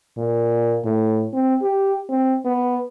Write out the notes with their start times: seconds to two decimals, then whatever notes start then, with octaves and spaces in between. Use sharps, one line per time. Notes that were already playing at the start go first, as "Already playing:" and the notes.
0.17 A#2
0.85 A2
1.34 C4
1.62 G4
2.09 C4
2.45 B3